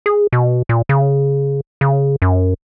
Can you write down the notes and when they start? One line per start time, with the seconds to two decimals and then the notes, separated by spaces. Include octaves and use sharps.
0.06 G#4
0.33 B2
0.69 A#2
0.89 C#3
1.81 C#3
2.22 F#2